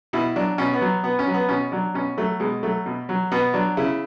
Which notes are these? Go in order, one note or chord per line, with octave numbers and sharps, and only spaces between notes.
B2 E4
F#3 D4
B2 C#4
B3
F#3
B2 B3
C#4
F#3
B3
B2 C#4
F#3 D4
B2 C#4
F#3 A3
B2 G#3
F#3 A3
B2
F#3
B2 B3
F#3 D4
C#3 E4